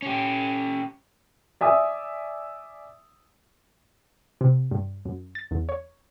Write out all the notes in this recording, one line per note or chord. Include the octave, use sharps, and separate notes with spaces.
C#4 G4
D5 E5 G#5 D#6
C3
G2
F#2
A6
E2
C#5